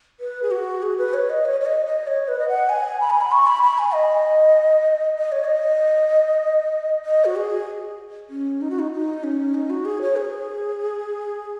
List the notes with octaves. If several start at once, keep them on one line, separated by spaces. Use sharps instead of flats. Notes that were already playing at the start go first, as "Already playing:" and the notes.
B4
G#4
F#4
G#4
B4
C#5
D#5
C#5
C#5
D#5
D#5
C#5
B4
D#5
F#5
G#5
B5
G#5
B5
C#6
B5
B5
G#5
D#5
D#5
C#5
D#5
D#5
F#4
G#4
C#4
D#4
F#4
D#4
D#4
C#4
D#4
F#4
G#4
C#5
G#4